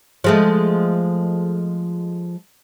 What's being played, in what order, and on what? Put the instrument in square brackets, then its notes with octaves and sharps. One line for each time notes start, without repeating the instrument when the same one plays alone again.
[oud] F3 G#3 A3